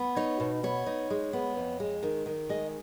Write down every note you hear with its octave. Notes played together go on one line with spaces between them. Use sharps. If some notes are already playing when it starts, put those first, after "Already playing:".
Already playing: B3
D#4 C#5
B2
B3 C#5
D#4
G#3
B3
F2
G#3
D#3
D#3
G#3 D#5